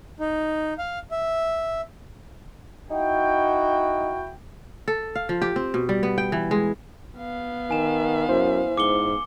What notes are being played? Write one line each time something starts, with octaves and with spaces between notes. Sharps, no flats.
D#4
F5
E5
D#4 E4 F#4 G5
A4
F5
F3
G4
C4
B2
G3
B3
G5
E3
G#3
B3 F5
D#3 G#5 E7
F#2 E4 C5
G#2 D6 C#7 G7